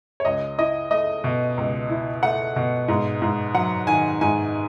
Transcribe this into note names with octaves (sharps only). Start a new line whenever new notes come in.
C#5
C#2 D#5
E4 D#5
A3 D#5
B2
C#2
E4
A3 F#5
B2
G#2
G#2
F#3 F#5
D#3 G#5
G#2 G#5